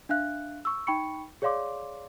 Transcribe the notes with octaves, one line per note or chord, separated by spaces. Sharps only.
D4 E5 F5 F#6
C#6 E6
D#4 G5 B5 C#6 C#7
G#4 C#5 D5 F5 C6 D6